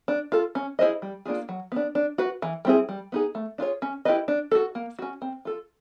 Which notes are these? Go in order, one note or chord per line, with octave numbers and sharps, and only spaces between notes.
D4
F4 A4
C#4
E4 G#4 C5 D#5
G3
A#3 D4 F4 G#4
F#3
B3 D4
D4
F#4 B4
E3
G3 C4 E4 G#4
G3
B3 D#4 G#4
A3
D4 F4 G#4 C#5
C#4
E4 G4 B4 D#5
D4
F#4 A4
A#3
C#4 F#4
C4
F4 A4